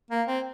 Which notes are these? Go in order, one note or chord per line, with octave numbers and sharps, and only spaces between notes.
A#3
C4